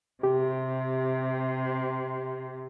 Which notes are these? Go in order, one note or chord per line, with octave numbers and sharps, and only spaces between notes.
C3 G4